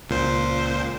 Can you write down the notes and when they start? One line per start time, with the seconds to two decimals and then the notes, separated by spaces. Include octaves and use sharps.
0.10 C#2 A#2 C5